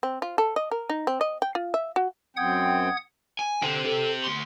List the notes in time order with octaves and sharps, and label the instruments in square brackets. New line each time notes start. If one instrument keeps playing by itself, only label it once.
[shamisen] C4
F4
A4
D#5
A#4
D#4
C4
D#5
G5
F4
E5
F#4
[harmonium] F#2 C4 G5 [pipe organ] F#5 D#6 G#6
[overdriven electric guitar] G#5
[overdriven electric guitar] D3 [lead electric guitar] C4 G4
[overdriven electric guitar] A4
D2 C6